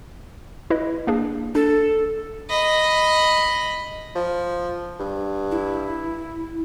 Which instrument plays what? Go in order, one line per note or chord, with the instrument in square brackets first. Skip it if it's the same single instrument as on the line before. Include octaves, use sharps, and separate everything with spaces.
[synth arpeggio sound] E4 B4 D#5
A#3 D4 G#4
[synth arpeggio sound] D4 [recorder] A4
[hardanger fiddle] D#5 B5
[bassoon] F3
G2
[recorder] E4